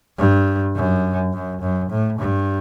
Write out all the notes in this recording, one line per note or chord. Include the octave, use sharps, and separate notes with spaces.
G2
F#2
F#2
F#2
A2
G2